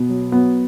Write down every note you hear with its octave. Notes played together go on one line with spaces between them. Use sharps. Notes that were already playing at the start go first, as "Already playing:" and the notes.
Already playing: B2 B3
F#3
F#3 B3